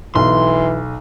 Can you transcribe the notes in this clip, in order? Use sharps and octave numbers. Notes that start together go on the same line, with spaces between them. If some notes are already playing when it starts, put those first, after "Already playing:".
B1 E3 C6